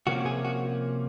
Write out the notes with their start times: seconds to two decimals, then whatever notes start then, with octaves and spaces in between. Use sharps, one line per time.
0.07 C3 F3 A#3 C#4 F#4
0.26 G#4
0.45 F#4